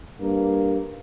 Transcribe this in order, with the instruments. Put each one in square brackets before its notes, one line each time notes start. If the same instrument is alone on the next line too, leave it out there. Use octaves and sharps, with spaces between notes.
[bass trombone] G2 [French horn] A#3